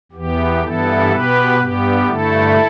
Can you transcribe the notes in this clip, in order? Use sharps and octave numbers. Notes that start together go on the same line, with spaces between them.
E2 E3 B3 G4
G2 E3 G3 B3 E4 A4
B2 B3 G4 B4
G2 G3 B3 G4
G2 D3 A3 E4 A4